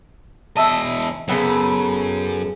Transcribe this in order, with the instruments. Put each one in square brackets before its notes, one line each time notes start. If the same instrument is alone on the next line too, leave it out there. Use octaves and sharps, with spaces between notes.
[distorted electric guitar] E2 D#5 [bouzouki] E4 A5
[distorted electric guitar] F#2 [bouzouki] C#3 B3 A4